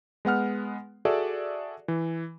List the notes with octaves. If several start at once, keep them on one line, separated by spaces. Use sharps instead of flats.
G#3 B3 F#5 F6
F#4 G#4 A4 D5 E5
E3